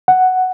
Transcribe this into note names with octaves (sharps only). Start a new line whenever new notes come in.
F#5